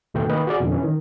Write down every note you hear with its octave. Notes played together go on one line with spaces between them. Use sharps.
D2 G#2 B2 D#3 A3 G5
D#3 A#3 B4 D#5 G5
F#4 G#4 D5
F2 B2 D3 E3
E3 C#4
D#3